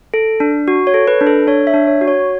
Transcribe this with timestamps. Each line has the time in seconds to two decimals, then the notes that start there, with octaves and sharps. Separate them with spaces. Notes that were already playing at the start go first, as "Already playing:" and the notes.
0.14 A4
0.40 D4
0.68 F#4
0.87 C#5
0.94 A4
1.07 B4
1.21 D4
1.27 A4
1.47 D4 C#5
1.67 E5
1.74 D4
1.87 C#5
2.01 F#4
2.08 C#5